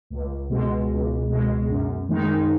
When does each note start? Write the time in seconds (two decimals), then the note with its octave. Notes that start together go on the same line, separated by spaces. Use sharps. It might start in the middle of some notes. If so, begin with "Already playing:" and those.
0.10 C#2
0.50 B2 G#3
0.90 C#2
1.30 B2 G#3
1.69 F#2
2.09 D#3 G#3 D#4